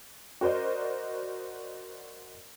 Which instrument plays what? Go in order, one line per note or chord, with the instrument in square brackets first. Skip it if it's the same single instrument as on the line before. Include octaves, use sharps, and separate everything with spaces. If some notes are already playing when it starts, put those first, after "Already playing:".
[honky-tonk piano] F#4 A#4 C5 D5 D#5